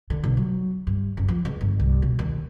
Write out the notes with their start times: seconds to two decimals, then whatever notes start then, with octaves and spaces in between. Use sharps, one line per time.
0.10 D3
0.24 B1
0.37 F#3
0.87 G2
1.17 F#1
1.28 F3
1.45 C#2
1.61 G1
1.80 C2
2.02 B2
2.19 D#2